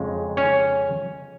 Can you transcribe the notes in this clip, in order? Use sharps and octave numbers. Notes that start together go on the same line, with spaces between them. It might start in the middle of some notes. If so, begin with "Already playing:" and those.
Already playing: F2 C#3 G#3
C#4 C#5